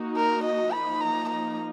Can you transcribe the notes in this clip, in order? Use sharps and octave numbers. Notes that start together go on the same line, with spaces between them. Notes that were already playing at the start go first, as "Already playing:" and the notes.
Already playing: A#3 D#4 F#4
A#4
D#5
F3 A#3 D#4 B5
A#5
A#5